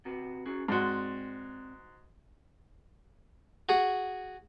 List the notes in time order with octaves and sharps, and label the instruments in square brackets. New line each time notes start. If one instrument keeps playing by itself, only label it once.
[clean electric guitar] C3 F#4 B4
C#4 F#4 G#4
[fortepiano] G#2 F#4 [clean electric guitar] C4 D5 C6
[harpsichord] F#4 G#4